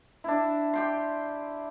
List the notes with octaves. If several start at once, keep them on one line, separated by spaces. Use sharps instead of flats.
D4 E4
G4 G5 C6